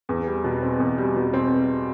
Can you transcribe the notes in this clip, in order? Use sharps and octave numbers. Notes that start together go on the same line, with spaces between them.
E2
G3
B2
C4
E2
G3
B2
C4